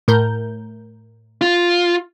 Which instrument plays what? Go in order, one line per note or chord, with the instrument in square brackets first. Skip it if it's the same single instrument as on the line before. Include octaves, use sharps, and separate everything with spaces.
[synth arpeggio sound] A2 A#4 G6
[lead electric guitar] F4